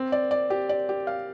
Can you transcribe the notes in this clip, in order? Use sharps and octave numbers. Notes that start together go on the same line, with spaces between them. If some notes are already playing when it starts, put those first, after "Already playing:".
Already playing: C4
D5
D5
G4
D5
G4
F5